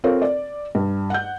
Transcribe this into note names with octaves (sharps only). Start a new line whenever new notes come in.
C4 F4 A4 A#4 C#5
D5
G2
F#5 G6